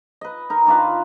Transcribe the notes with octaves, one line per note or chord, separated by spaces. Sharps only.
B4 D#5
D#4 A#4
D#3 D4 F4 B4